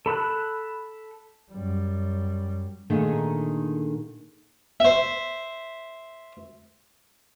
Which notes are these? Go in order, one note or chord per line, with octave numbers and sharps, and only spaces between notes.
A4 B5 E6 F#6
F#2 G3
A#2 D3 D#3 A3 D#4 G#4
C5 E5